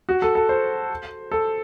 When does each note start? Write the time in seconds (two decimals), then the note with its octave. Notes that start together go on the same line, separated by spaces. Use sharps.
0.09 F#4
0.22 A4
0.35 A4
0.49 C5
1.31 A4